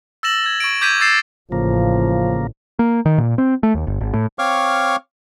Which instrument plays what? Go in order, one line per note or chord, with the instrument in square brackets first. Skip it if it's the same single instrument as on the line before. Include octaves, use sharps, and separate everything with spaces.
[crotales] E6 A6 A#6 E7 F#7
E6 G#6
C#6 G#6 D7
D6 G6 G#6 B6 D#7
D6 E6 A6 C7 E7
[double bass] A1 [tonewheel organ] C#3 A#3 [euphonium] F3
[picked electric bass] A#3
D#3
A#2
C4
A3
D#2
G1
G#1
A2
[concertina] C4 C#5 F5 C#6 D6 F6